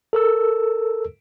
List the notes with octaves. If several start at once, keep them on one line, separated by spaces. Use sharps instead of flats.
A4 A#4 E6